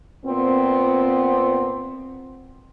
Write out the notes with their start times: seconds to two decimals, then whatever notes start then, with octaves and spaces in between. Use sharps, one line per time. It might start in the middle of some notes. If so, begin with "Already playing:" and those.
0.25 A#2 B3 C4